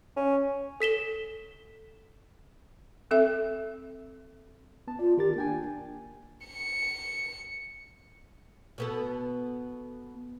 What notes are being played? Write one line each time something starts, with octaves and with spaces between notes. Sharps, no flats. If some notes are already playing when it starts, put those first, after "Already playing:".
C#4
A4 B6 E7 G7
C4 A4 E5
B3 A5
F4 D5
D#3 G4 A#4 A6
A#3 D4 G5 G#5
C#7
B2 B3 A4